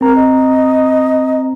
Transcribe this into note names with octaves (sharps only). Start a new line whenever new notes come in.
C4 A#4 A#5
D#5